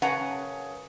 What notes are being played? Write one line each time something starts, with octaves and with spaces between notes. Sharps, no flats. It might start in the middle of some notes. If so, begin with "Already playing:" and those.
F#2 C#3 B4 F#5 A5 A#5